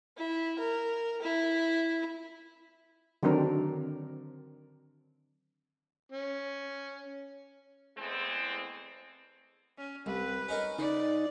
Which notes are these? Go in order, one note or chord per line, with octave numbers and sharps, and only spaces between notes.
E4
A#4
E4
D3 D#3 F#3 C4 D4 A#4
C#4
E2 E3 G#3 A3 C4
C#4
C2 B4
C#4 D#4 A#4
C#3 D#4 D5